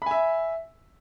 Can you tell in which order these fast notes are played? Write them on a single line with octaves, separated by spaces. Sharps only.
B5 G#5 E5